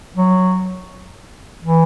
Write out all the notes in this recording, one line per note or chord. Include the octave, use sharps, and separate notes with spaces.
F#3
E3